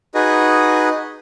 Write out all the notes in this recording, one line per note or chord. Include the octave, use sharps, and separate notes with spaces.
D#4 F#4 G#4 B4 D#5